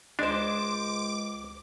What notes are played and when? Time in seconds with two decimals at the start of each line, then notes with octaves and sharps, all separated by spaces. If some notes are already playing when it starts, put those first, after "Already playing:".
0.19 C#2 G#3 D4 C5 D6